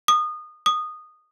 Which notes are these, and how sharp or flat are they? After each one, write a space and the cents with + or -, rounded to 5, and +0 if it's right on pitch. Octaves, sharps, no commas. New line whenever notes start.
D#6 -25
D#6 -15